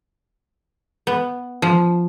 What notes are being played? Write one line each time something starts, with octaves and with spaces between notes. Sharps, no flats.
B3
F3